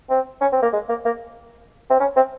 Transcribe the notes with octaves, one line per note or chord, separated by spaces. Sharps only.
C4
C#4
C4
A#3
G#3
A#3
A#3
C4
C#4
C4